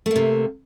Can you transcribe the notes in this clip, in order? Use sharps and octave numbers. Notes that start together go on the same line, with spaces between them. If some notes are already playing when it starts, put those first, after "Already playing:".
C3 A3 A#3